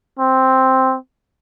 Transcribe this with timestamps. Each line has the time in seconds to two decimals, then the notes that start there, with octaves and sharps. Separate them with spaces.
0.19 C4